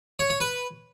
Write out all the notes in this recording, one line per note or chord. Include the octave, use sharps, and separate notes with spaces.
C#5
C#5
B4